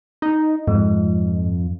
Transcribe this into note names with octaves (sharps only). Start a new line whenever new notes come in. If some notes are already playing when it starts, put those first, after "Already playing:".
D#4
F2 G#2